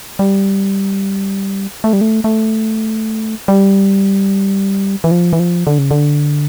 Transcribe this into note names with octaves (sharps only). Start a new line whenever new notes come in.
G3
A3
G3
A3
A3
G3
E3
F3
E3
F3
D3
C#3
D3